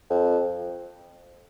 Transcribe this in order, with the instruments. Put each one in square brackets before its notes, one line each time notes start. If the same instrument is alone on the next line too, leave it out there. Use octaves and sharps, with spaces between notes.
[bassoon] F2